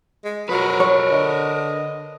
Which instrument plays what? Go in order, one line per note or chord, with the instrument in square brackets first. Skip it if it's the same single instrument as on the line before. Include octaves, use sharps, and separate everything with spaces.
[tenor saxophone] G#3
[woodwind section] F2 B2 [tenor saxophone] F#3 [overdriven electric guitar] A#4 B4
[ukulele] C#5
[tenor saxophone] D3 [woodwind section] D#5